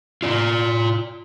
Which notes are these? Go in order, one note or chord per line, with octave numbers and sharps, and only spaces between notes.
F4 D5